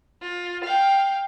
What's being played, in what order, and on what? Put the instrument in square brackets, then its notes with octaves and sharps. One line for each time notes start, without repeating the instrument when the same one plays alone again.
[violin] F4
F5 G5